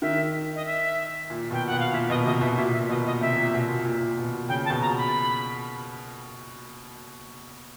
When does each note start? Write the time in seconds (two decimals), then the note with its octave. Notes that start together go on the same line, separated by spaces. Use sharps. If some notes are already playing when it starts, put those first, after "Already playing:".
0.02 D#3 E5
0.55 D#5
0.65 E5
1.30 A#2
1.50 B2 G5
1.66 F#5
1.72 B2
1.79 F5
1.93 A#2 E5
2.09 B2 D#5
2.25 C3 D#5
2.41 B2 E5
2.57 A#2 E5
2.73 E5
2.89 B2 D#5
3.05 D#5
3.21 C3 E5
3.37 A#2
3.54 B2
3.69 A#2
3.85 A#2
4.01 A#2
4.18 B2
4.49 C#3 G5
4.65 A5
4.70 B2
4.81 A#5
4.97 B5